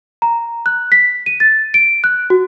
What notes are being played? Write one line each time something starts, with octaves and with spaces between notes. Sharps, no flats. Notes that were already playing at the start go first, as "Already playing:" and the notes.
A#5
F#6
B6
D#7
A6
D7
F#6
F#4